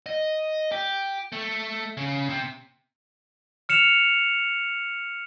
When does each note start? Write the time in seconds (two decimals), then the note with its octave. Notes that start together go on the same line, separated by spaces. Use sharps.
0.06 D#5
0.72 G4
1.32 A3
1.97 C#3
2.29 C3
3.69 F6 C#7 E7 F7